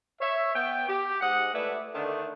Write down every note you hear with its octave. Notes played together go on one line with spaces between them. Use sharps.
C#5 E5
B3 G5
G4
G#2 D#5 F#5
A3 E4 B4 D5 E5
D3 D#3 A3 D4 E5